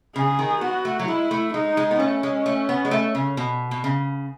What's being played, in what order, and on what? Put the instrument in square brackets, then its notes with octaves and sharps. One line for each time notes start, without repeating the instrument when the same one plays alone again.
[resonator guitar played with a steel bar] C#3 [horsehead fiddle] G#4
[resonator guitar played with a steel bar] D#3
[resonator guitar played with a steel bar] B3 [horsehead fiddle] F#4
[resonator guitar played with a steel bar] A3
F#3
[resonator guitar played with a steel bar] G#3 [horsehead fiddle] E4
[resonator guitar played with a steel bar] A3
[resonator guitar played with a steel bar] G#3 [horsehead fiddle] D#4
[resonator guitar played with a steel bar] G#3
B3
[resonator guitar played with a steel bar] A3 [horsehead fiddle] C#4
[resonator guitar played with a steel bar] G#3
A3
B3
G#3
A3
C#3
B2
B2
C#3